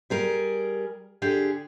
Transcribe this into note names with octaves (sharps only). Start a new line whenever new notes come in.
G3 G#4 A#4
D3 G4 G#4